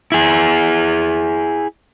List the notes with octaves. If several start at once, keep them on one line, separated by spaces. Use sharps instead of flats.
E4 G#4